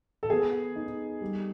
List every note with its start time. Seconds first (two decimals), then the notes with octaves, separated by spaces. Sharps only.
0.23 A4
0.30 B3 G#4
0.76 D#4
1.21 G3